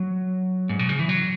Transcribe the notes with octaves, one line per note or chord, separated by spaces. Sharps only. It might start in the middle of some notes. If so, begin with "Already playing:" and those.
Already playing: F#3
G#2
B2
C#3
E3
F#3